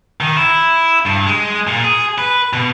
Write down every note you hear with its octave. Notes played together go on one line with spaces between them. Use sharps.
D#3
E4
G2
G#3
A#2
G#4
B4
B2